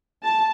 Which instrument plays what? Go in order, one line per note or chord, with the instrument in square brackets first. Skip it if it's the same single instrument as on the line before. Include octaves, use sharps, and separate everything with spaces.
[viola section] A5